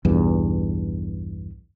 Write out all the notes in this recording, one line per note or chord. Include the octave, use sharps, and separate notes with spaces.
B1 E2 G2